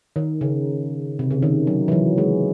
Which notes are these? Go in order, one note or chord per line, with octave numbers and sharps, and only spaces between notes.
D#3
C#3
C3
C#3
D#3
F#3
E3
F#3
G#3